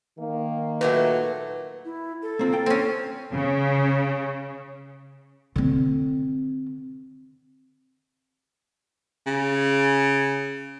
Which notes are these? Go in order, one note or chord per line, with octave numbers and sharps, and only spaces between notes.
D#3 A#3
A#2 F#3 A3 B4
E4
A4
A#3 C4 F4
A#3 G5
C4 C#4
C#3
D3 C4
C#3